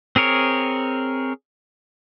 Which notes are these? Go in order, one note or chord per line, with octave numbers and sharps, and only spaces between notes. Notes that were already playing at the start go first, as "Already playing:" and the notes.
C4 G#4 A#4 C#5